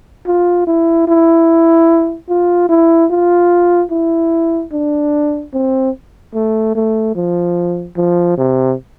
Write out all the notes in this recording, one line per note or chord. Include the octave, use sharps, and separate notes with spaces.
F4
E4
E4
F4
E4
F4
E4
D4
C4
A3
A3
F3
F3
C3